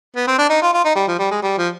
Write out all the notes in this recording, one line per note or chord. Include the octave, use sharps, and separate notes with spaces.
B3
C4
D4
D#4
F4
F4
D#4
G3
F3
G3
G#3
G3
F3